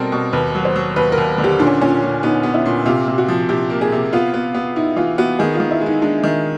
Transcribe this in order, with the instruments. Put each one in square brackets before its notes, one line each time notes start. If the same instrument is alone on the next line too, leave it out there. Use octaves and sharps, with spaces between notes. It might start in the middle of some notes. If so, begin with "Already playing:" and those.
Already playing: [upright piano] B2 G3 C4 [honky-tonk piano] A4 A#4
[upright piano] B2
[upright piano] D#2 [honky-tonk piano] B4
[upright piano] F#3
[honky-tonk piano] C5
[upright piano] F#3
[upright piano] D#2 [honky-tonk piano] B4
[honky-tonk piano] A#4
[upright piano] D#2
D3
[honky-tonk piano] G4
[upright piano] A#2 [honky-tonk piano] D4
[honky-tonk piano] C#4
[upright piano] A#2 [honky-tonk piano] C#4
[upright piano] A#2
[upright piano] B3 [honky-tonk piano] D#4
[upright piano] B3
[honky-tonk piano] E4
[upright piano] A#2
[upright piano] C3 [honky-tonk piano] F4
[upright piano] C3
[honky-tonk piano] F#4
[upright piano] F3
[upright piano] C3 [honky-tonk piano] G4
[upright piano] A#3
[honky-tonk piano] G#4
[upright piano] C3
[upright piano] B3 [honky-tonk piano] F4
[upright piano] B3
B3
[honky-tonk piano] D#4 [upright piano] E4
[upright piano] E3 [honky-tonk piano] F4
[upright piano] B3 [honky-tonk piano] F#4
[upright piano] D#3 [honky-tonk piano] G#4
[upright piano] D#3 [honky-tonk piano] F4
[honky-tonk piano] E4
[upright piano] G#3
[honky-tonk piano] D#4
[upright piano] G#3 [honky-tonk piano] D4
[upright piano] D#3